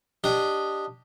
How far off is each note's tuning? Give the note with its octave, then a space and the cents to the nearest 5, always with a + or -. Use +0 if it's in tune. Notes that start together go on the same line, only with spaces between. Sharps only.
D4 +0 G4 +0 D#5 -5